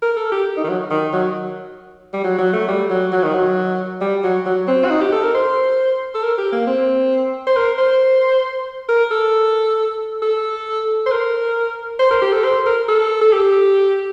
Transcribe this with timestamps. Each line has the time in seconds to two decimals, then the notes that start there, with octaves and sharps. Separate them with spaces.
0.02 A#4
0.17 A4
0.32 G4
0.57 D#4
0.64 D#3
0.69 F#3
0.90 D#3
1.13 F#3
2.14 G3
2.24 F#3
2.39 F#3
2.53 A3
2.68 G3
2.90 F#3
3.13 F#3
3.23 D#3
3.34 F#3
4.01 G3
4.24 F#3
4.46 F#3
4.68 C4
4.85 F#4
4.90 D#4
5.01 G4
5.12 A4
5.23 A#4
5.35 C5
6.15 A4
6.23 A#4
6.38 G4
6.52 A#3
6.67 C4
7.47 C5
7.56 A#4
7.78 C5
8.89 A#4
9.11 A4
10.22 A4
11.06 C5
11.11 A#4
11.99 C5
12.11 A#4
12.22 G4
12.33 A4
12.44 C5
12.66 A#4
12.89 A4
13.21 A4
13.33 G4